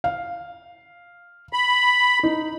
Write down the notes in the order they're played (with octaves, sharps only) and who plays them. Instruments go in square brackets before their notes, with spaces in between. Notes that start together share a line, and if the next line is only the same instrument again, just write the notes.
[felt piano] F5
[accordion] B5
[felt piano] D#4